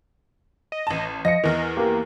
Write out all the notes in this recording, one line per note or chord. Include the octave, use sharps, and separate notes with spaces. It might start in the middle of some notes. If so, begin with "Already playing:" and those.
D#5
A1 A5
F3 D#5 A#6 C#7
E2 E3 A#4
A#3 G4 A#4